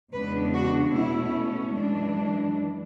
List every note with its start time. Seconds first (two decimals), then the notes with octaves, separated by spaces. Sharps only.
0.13 E2 C#3 G#3 B3 D4 B4
0.54 F#4
0.93 B2 A3 C#4 E4
1.74 F#2 E3 G#3 D4